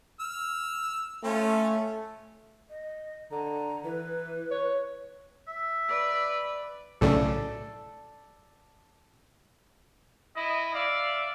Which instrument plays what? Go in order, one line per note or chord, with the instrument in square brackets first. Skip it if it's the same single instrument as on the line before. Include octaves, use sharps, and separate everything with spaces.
[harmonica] E6 F6
[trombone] A3 [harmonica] C#4 F4
[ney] D#5
[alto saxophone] D3 [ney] A#5
[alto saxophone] E3 [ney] B4
[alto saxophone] C#5
[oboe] E5
[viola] B4 D5
[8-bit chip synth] B1 A2 C#3 [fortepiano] A4 D5
[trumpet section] E4 D#5
D5 E5 F5